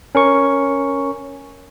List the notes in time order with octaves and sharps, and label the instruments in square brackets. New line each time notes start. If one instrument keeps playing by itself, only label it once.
[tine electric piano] C#4 A#4 C#6